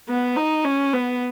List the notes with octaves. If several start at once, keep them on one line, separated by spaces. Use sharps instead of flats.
B3
D#4
C#4
B3